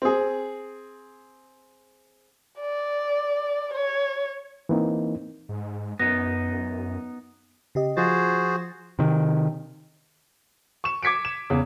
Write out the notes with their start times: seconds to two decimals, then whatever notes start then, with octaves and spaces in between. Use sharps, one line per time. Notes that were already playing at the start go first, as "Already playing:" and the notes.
0.02 C4 G#4
2.60 D5
3.74 C#5
4.69 E3 A#3 C4 D#4
5.49 G#2
6.00 F#2 B3 D#4 A#6
7.75 C#3 G4 D#5
7.97 F3 F4 F#4 G#4 C5 A6
8.99 C3 D#3
10.84 C#6 E7
11.03 D6 G#6 B6 C#7 D7
11.25 E7
11.50 E2 C#3